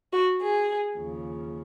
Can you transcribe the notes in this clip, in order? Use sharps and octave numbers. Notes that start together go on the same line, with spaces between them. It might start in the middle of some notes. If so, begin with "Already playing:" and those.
F#4
G#4
D#2 C#3 F3